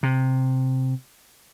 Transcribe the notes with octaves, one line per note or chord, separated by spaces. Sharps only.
C3